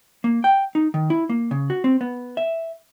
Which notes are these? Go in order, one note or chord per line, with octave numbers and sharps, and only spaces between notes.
A#3
G5
D#4
D#3
E4
A#3
C#3
F#4
C4
B3
E5